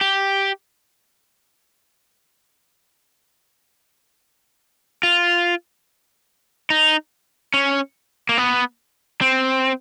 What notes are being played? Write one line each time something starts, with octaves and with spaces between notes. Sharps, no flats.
G4
F4
D#4
C#4
A#3
B3
C4